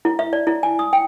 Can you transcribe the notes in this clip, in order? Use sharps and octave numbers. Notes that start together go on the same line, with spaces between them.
E4
E5
D5
E4
G#5
D#6
G5